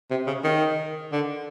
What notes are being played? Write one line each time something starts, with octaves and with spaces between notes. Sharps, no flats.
C3
C#3
D#3
D3